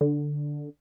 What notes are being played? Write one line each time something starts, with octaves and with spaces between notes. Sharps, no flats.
D3